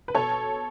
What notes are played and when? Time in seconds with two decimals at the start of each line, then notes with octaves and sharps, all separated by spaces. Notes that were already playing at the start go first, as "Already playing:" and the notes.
0.08 B4
0.15 B2 A4 C#5